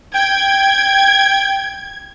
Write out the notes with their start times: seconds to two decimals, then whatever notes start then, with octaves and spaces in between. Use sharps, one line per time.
0.14 G5 G#6